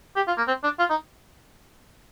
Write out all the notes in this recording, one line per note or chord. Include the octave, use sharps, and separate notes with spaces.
G4
F4
A#3
C4
D4
F4
D#4